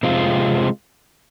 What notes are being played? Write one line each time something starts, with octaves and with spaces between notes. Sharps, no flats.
C3 G#3 C4 F4